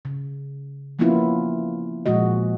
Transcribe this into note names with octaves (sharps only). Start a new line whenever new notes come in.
C#3
F3 A#3 B3 C#4 E4 F4
A#2 F3 G#3 F#4 D#5